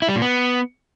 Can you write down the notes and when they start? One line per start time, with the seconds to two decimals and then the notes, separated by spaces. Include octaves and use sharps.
0.02 E4
0.09 G3
0.15 A#2
0.22 B3